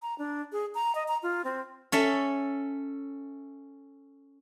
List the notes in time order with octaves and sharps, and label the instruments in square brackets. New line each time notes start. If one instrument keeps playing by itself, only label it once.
[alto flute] A#5
D4
G#4
A#5
D#5
A#5
F4
C4
[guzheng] C#4 A4 E5